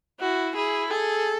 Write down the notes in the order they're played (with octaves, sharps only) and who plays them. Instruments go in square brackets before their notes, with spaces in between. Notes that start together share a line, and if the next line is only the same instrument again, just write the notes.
[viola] E4 [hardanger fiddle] F#4
[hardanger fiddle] E4 [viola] G#4
[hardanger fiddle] G#4 [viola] A4